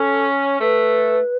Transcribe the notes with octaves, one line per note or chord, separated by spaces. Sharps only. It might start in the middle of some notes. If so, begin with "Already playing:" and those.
Already playing: C#4 A4
A3 B4